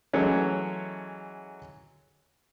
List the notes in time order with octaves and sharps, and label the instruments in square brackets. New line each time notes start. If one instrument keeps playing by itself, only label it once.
[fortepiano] E3 F#3 G#3 A3 C#4